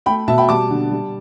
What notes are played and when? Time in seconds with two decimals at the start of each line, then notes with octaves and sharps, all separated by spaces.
0.06 A3 G5 B5
0.28 B2 E5 A5
0.38 G5 B5
0.49 G3 A5 D6
0.70 D3
0.91 G3